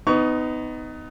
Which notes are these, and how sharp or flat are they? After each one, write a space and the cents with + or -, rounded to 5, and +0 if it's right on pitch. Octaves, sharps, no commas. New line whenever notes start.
B3 +30 D#4 +0 C#6 +25